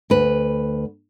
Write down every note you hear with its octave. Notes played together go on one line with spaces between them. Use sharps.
D2 B4